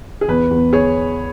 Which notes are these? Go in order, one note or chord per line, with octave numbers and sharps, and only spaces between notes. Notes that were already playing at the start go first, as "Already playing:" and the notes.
G#4
E2 B4
E2
G#4 C#5